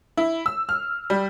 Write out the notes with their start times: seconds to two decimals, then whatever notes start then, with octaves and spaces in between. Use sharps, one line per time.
0.17 E4
0.46 E6
0.69 F6
1.10 G3